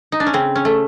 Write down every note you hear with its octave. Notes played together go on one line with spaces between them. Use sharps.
D#4
D4
C#4
C#3 C4
C#4
A3